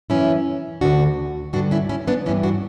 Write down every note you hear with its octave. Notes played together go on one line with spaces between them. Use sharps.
F#2 E3 C#4 E4
D2 D3 D4 F#4
G2 D3 D4 F#4
C#4 E4
C#4 E4
B3 D4
G2 E3 C#4 E4
D4 F#4